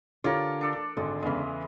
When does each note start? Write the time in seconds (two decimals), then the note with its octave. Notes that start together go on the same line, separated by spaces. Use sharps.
0.24 D3 F4 G4 A#4 C#5 D5
0.61 D4 A4 D5
0.97 G#1 D3 G#3
1.23 E2 C#3 E3 G#3